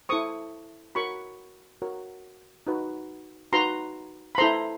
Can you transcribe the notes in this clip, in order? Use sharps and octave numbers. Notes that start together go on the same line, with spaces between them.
E4 A4 C5 C#6 D#6
F#4 A#4 C#5 B5 C#6
F#4 A#4 C#5
D#4 F#4 B4
D#4 F#4 B4 A#5 C6
B5
E4 A4 C5 A#5 C6